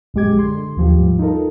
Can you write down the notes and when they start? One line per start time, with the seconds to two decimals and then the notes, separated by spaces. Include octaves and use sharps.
0.14 A#1 F#2 G#3 G4 D6 G#6
0.39 D3 C6
0.77 D#2 F3 G4
0.98 G#2 F3 G3
1.19 D#4 F4 A4 A#4